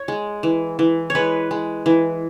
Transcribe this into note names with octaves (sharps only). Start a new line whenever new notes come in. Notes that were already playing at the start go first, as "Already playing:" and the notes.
Already playing: C#5
G#3
E3
E3
C#5
G#3 B4
G#3
E3